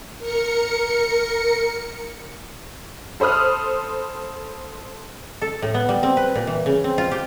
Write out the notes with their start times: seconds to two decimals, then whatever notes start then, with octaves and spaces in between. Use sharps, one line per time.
0.18 A#4 C#7
3.20 A4 C5 B5 D#6 F6
5.42 A4
5.62 A2
5.74 B3
5.89 G3
6.03 C4
6.17 B4
6.35 A#2
6.47 E3
6.66 C#3
6.84 C4
6.98 F4
7.11 G4